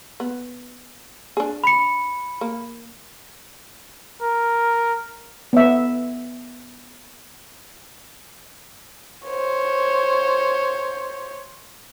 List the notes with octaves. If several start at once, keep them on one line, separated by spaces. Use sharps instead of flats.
B3
D4 G#4
B5 C#7
A#3
A#4
B3 E5
C5 C#5